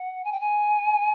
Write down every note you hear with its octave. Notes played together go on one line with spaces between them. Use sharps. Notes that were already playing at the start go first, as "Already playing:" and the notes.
Already playing: F#5
G#5
G5
G#5